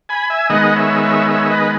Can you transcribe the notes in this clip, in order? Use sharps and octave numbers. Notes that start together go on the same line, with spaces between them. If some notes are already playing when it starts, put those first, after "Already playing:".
G#5 B5
E5 G#5
D#3 G#3 B3 D#5 F#5
C#5 E5
C#5 E5
C#5 E5
B4 D#5